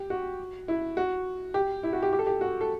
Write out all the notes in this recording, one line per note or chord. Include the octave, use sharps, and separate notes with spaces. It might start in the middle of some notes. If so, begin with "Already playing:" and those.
Already playing: G4
F#4
E4
F#4
G4
E4
F#4
G4
G4
A4
G4
F#4
A4